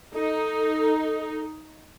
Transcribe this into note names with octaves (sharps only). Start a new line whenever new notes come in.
D#4 A4